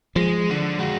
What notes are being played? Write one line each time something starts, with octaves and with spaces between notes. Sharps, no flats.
F3 G#3
D3
G#3 F#4